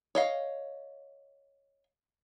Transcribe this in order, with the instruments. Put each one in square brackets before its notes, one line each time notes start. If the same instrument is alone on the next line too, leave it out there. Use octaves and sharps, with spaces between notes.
[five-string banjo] C#5 D#5 F5